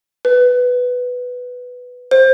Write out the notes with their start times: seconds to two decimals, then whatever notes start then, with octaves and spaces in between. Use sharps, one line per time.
0.25 B4
2.11 C5